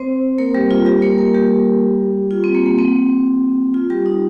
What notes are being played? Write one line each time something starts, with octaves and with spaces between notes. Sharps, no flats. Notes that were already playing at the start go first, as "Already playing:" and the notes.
Already playing: C4 C5
A#3 A#4
G3 G4
F4
G3 G4
A#3 A#4
A#3 A#4
G3 G4
F4
C4
A#3
A#3
C4
F4
G3 G4
D#4